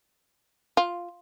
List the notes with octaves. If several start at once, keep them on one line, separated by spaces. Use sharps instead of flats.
F4